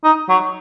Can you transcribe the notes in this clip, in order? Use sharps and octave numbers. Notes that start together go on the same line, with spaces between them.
D#4
F#3